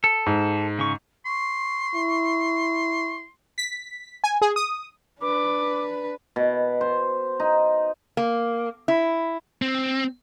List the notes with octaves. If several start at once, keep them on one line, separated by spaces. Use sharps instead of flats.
A4
G#2
C#3 C#6
C6 C#6
E4
B6
G#5
G#4
D#6
D4 B4 D6
B2
C5
D#4
A#3
E4
C4